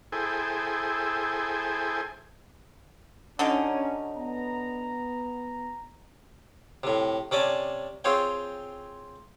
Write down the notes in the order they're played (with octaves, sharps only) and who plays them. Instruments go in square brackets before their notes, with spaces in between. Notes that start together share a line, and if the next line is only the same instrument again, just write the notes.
[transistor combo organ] E4 G#4 A4 C5 G5 G#5
[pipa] D3 F#3 D#4 [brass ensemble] C#4
[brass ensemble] B3 A#5
[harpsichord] A2 C3
C3 C#4 D5 G#5 A5
C4 F4 G#4 C#5 G5